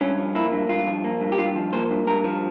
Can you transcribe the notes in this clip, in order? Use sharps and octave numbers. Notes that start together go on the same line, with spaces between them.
G2 C#4
F3
A#3 E4
G2
G2 F4
F3
A#3
G2
G4
G2 F4
F3
A#3 C5
G2
G2 A#4
F3